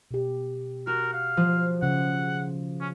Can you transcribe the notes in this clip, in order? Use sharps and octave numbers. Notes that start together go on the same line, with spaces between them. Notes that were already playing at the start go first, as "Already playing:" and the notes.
B2 G4
F#4 A#4
F5
F3
C#3 F#5
C#4